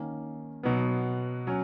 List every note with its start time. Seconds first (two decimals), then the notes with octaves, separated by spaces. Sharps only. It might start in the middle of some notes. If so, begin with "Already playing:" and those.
Already playing: D#3 A#3 C#4
0.63 B2 F#3 B3
1.47 F#3 C#4